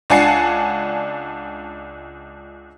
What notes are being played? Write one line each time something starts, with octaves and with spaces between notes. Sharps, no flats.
C#2 D4 F#5 G#5 A5 C7